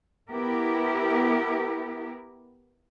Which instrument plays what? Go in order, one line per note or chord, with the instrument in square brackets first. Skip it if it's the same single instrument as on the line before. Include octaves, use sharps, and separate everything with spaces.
[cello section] B3 E4 G4 A#4